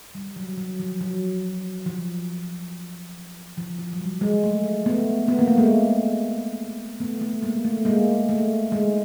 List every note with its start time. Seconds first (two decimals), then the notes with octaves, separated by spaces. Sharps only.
0.15 G3
0.36 F#3
0.57 F#3
0.79 F3
1.01 F#3
1.86 F3
3.57 F3
3.79 F3
3.93 F#3
4.01 G3
4.21 G#3
4.44 A3
4.86 A3 B3
5.28 B3
5.39 A#3
5.48 A3
5.57 G#3 A#3
7.00 A3 B3
7.21 A3 B3
7.42 G#3 A#3
7.65 A3
7.85 G#3 A#3
8.29 A3
8.72 G#3